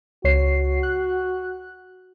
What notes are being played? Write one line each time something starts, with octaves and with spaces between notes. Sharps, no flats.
C#2 F#4 C#5 C7
F#6